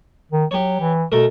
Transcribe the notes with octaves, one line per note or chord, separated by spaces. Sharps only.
D#3
F#3 G4 C#5
E3
B2 A3 A#4